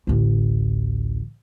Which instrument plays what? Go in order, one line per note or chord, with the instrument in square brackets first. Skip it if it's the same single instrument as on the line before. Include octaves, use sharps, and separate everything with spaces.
[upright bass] A1 D2